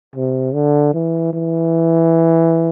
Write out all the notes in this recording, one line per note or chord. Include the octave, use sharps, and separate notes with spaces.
C3
D3
E3
E3